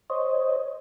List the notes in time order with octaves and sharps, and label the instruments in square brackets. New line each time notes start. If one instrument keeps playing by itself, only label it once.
[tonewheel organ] C5 C#5 D#5